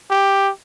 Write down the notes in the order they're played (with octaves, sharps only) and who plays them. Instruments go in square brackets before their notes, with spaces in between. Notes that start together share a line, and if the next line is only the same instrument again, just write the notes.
[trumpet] G4